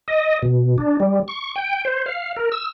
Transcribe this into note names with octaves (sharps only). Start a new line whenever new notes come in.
D#5
B2
D4
G3
C#6
G5
C5
F5
A#4
E6